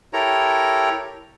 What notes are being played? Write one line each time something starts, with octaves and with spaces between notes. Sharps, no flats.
E4 G4 A4 A#4 C#5 A#5